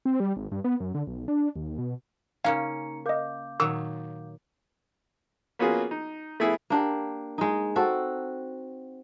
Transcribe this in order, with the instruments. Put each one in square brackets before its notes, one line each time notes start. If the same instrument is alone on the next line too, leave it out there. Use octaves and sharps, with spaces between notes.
[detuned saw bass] C4
G3
G#1
G2
B3
F#2
D3
B1
D4
D#2
B2
[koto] C#3 A#3 C#4 [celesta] D#4 A#5 C#7 [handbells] F5
[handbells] A#4 D#5 [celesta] F5 D6 G6
[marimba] A#2 [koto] D#3 F#3 [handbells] E6
[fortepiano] A#3 B3 C#4 F4 F#4 G#4
D#4
A3 B3 E4 G#4
[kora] A#3 D4 G4
G#3 D#4
C4 F#4 A4